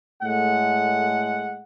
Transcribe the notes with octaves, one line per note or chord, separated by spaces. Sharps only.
A2 G#3 A3 F#5